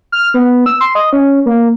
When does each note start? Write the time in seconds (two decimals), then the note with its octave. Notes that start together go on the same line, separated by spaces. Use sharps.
0.12 F6
0.34 B3
0.66 E6
0.81 C6
0.95 D#5
1.13 C#4
1.46 A#3